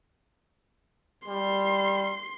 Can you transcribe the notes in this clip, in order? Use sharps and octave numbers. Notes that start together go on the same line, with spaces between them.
G3 C6